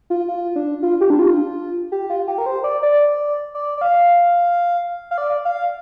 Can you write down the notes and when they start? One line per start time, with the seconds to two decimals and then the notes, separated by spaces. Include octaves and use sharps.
0.10 F4
0.28 F4
0.56 D4
0.83 F4
1.01 G4
1.10 D4
1.19 F4
1.92 G4
2.10 F4
2.28 G4
2.38 A#4
2.46 C5
2.64 D5
2.82 D5
3.55 D5
3.77 D5
3.81 F5
5.11 F5
5.18 D5
5.45 F5